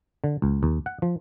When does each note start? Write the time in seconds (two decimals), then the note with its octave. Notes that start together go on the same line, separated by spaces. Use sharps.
0.24 D3
0.42 C#2
0.63 D#2
0.86 F#5
1.02 F3